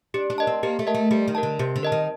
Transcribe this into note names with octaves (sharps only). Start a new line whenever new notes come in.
D4 G4
D4
A#4 D#5 A5
C4
A#3 G4
A3
A#4 D#5 A5
A3
G3 G4
D#3
A#4 D#5 A5
D3
C3 G4
D3
A#4 D#5 A5
D#3